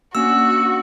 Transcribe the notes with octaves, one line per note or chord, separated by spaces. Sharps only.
A#3 C#4 D4 F#4 E6